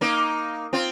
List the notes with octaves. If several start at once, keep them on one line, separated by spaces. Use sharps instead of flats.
A#3 D#4
C4 F4